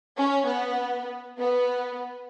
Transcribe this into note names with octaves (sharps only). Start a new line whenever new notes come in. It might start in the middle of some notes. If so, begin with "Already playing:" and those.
C#4
B3
B3